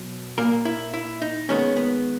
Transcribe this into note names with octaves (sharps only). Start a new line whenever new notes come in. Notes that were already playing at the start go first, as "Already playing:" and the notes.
Already playing: B2 F#3
A#2 A#3 A#4
E4
E4
D#4
D#3 G#3 B3 C#4
B3